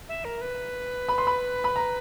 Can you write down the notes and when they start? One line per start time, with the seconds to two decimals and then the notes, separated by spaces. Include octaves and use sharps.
0.09 E5
0.25 A#4
0.41 B4
1.08 B5
1.18 C6
1.27 B5
1.64 B5
1.76 A#5